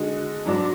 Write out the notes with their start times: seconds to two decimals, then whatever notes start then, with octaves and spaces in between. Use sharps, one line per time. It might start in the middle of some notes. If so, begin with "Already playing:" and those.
Already playing: D3 G#3 D#4 F#4
0.46 G#2 F#3 D4 F#4 D5